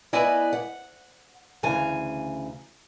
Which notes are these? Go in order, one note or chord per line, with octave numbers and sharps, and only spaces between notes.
B3 E4 B4 D5 D#5 G#5
F#5
D2 C#3 E3 G#5 A#5